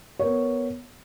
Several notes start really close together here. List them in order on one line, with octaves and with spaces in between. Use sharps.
C#5 A#4 B3